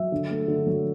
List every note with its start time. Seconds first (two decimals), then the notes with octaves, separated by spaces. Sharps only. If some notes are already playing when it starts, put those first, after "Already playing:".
Already playing: F#3 E5
0.12 D3
0.30 A3
0.48 D3
0.67 F#3